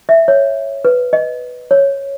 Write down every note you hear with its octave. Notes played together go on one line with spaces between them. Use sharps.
E5
C#5
B4
D#5
C#5